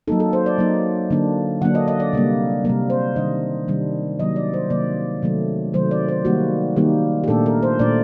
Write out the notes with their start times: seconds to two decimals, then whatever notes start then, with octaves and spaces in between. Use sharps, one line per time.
0.08 F#3 A#3 D#4 A4
0.20 A4
0.33 C5
0.46 D5
0.59 F#3 A#3 D#4
1.11 D3 F#3 A#3 D4
1.62 D3 F#3 A#3 D4 F#5
1.75 D#5
1.88 D#5
2.00 D5
2.13 C3 G3 A#3
2.65 C3 G3 A#3 A#4
2.90 C5
3.16 C3 D#3 G3 D4 D#5
3.68 C3 D#3 G3 D4
4.19 C3 D#3 F#3 A#3 D#5
4.36 D5
4.54 C5
4.70 C3 D#3 F#3 A#3 D5
5.22 C3 D#3 F#3 A3
5.73 C3 D#3 F#3 A3 C5
5.91 D5
6.09 C5
6.25 D#3 G3 A#3 D#4 F#4
6.76 D#3 G3 A#3 D#4 G4
7.24 G4
7.28 A#2 A3 D4 A4
7.46 A#4
7.63 C5
7.79 A#2 A3 D4 D5